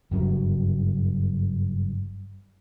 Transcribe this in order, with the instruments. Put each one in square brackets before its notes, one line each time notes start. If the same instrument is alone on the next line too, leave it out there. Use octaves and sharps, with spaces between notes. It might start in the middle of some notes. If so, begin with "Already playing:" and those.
[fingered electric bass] F#1 G2 F#3 G3